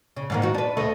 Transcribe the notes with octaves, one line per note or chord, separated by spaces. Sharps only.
C#3
G#2 D#3 A#3
D#4 F#4
D4 B4
D2 A3 D#5